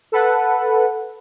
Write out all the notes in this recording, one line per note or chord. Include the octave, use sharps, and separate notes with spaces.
A4 B4 F#5